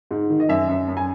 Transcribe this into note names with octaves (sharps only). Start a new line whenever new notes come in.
G#2
D#3
D#5
F#2 E5
F#2
F#2
G#5